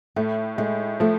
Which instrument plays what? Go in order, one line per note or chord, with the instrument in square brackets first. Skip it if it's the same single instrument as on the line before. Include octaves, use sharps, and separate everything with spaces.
[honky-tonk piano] A2 [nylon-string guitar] A3
[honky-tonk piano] A2 [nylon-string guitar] G#3
[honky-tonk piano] F3 [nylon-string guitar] A3